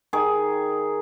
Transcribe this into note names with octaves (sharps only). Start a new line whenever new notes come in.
D#3 G#4